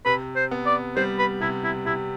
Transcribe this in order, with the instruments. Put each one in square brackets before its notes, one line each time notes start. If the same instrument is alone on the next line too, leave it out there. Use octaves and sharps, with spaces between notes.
[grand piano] C3 [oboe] B4
[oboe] C5
[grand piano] B3
[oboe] D5
[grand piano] G3 [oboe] C5
[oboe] B4
[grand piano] C3 [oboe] E4
[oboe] E4
[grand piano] C3 [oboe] E4